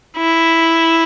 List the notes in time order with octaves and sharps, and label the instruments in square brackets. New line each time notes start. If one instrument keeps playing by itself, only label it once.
[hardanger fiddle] E4